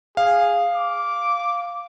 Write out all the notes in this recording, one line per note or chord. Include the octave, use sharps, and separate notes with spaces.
G#4 F5
D6